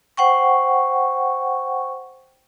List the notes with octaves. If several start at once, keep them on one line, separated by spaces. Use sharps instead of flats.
C5 F#5 G5 C#6